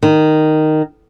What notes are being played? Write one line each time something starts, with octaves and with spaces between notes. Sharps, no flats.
D#3